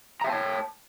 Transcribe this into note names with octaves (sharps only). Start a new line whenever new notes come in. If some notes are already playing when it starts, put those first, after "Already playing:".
C#5 E5 G5 A5 A#5